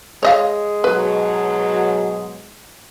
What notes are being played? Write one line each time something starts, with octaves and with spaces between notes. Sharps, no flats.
G#3 C#5 D#5 F5
G#2 B2 F#3 B4